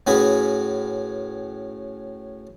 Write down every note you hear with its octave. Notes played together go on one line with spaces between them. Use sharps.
A2 C#4 F#4 G#4 B4 B5